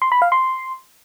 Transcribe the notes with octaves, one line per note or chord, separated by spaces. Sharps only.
C6
B5
F5
C6